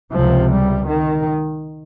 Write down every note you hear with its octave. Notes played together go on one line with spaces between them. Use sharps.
C#2 C3 F3
G3
D#3